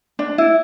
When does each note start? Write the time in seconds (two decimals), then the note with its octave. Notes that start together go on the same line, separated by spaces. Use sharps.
0.19 D4
0.38 E4